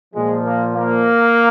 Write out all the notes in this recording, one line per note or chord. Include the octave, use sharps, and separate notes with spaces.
A#2 F3 G#3
A#3
A#3